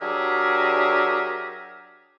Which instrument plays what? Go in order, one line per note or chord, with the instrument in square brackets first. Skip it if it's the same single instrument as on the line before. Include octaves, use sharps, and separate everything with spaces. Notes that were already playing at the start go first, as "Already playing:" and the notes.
[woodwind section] F#3 D4 G4 G#4 A#4 E5